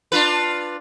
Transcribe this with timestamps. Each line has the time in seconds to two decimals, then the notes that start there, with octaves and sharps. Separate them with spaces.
0.12 D4 F4 B4